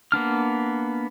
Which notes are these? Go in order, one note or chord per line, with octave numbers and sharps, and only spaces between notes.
A#3 B3 D4 F6